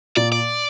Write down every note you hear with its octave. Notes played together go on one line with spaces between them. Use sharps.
A#2 D5
D5